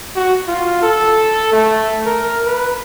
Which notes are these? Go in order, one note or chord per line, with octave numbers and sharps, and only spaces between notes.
F#4
F4
A4
A3
A#4
B4